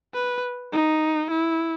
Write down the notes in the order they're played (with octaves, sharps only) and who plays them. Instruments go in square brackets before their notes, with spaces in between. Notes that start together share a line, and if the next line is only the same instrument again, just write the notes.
[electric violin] B4
D#4
E4